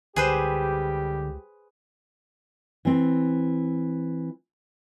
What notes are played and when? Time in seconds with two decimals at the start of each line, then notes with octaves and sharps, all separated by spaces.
0.16 C#2 D3 G3 G4 G#4 B4 C5
2.85 E3 C4